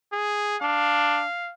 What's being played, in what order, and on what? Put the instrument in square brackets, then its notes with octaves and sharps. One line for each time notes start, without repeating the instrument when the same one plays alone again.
[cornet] G#4
[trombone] D4 [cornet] F5